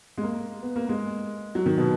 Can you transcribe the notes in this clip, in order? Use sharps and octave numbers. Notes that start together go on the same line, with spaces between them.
G#3
A#3
B3
A#3
G#3
F#3
D#3
B2